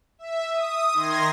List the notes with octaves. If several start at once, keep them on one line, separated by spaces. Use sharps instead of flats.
E5
D#6
D#3 C6 G#6 A#6